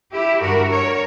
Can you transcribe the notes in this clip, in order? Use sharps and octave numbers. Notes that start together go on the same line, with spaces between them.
E4 G4
G2 D3 G3 F#4 A#4
A#4 C#5